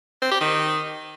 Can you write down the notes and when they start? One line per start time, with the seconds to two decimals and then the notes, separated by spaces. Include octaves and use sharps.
0.22 C4
0.31 G4
0.40 D#3